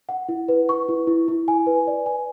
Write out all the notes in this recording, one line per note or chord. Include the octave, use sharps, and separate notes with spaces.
F#5
E4
B4
C#6
E4
E4
E4
G#5
B4
D5
G#5